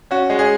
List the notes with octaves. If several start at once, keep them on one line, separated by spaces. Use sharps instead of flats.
C#4 F#4
G#3
G#4